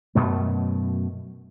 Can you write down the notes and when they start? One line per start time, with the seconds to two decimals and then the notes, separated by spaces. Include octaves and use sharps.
0.15 F#2 B2 A3